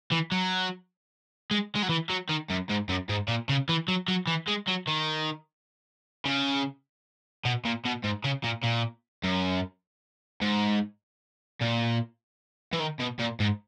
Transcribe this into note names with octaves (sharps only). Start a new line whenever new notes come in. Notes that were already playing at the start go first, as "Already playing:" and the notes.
E3
F#3
G#3
G#3
F#3
E3
F#3
D#3
F#2
G#2
F#2
G#2
A#2
C#3
E3
F#3
F#3
E3
G#3
F#3
D#3
C#3
B2
A#2
B2
G#2
C#3
A#2
A#2
F#2
G#2
A#2
E3
D#3
B2
A#2
G#2